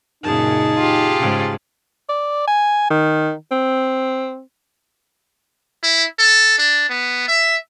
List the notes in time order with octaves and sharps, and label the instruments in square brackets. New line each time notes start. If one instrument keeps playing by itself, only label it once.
[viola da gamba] F#2 A#2 C#3 [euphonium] D#4 [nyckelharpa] G#4 A5
[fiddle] F4 G4
[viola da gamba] G#2 C#3
[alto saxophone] D5
G#5
D#3
C4
[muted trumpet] E4
A4
D4
B3
E5